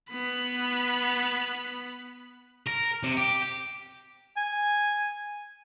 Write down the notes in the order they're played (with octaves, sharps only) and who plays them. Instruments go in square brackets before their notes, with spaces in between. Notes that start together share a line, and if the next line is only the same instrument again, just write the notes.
[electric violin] B3 B5
[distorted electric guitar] A#4
C3
G4
[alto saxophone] G#5